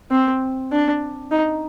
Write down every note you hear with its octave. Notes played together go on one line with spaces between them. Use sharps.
C4
D4
D#4